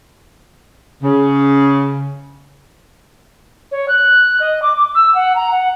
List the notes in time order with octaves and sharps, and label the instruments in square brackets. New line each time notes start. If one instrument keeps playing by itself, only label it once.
[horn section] C#3
[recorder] C#5
F#6
D#5
D6
E6
F#5
A#5
F#5